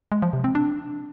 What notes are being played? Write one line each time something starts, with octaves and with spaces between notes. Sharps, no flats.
G#3
F3
C3
C4
D4